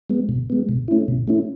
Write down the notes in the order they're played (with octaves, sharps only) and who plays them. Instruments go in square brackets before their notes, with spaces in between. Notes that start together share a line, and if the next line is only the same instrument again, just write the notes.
[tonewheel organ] G#3 B3
B2
G#3 B3
B2
A3 C#4 E4
B2
A3 C#4 E4